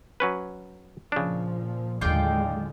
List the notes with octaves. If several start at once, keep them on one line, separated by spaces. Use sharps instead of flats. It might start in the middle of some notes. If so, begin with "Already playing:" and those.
F#3 C#4 B4
A#2 C#3 F3 D4
D#2 A2 D3 F#3 G#3 F4 D5 G5